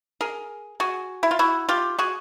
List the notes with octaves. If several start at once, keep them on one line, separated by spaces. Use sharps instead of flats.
G#4 A#4
F#4 G#4
E4
F4
E4 F#4
F4 G4
F#4 G#4